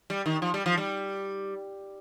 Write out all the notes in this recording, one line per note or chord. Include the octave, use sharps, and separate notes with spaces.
G3
D#3
F3
G3
F3
G3